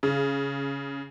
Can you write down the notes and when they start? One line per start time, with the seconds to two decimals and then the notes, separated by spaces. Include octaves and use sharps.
0.03 C#3